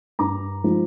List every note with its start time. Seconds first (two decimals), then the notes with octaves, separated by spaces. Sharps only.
0.19 G2 A#5 D6
0.64 F3 G#3 D#4